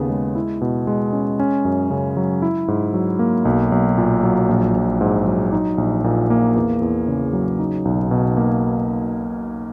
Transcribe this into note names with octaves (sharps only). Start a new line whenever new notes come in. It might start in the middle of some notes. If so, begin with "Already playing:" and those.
Already playing: D#2 C#3 B3
G#3
E4
B2
G#3
C#4
C#4
F#2
C#3
F#3
E4
G#2
F#3
A#3
B1
B1
A#2
F#3
A#1
A#1
G#2
F#3
D#4
A#1
A#2
A#3
E2
E2
C#3
F#3
D#4
B1
B2
A#3